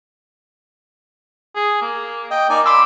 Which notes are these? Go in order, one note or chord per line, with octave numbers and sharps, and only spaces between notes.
G#4
A#3
D#5 G5
A#3 D#4 D5 G#5
B5 C6 D6 E6